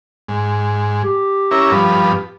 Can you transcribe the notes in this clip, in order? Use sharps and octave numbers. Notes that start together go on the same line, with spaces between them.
G#2
G4
C#4 E4 A#4
G2 F3 B3